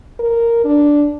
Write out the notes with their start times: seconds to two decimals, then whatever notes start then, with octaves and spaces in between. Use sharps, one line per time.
0.19 A#4
0.64 D4